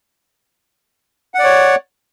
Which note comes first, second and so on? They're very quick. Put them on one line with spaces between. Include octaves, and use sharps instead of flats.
F#5 D5 C#5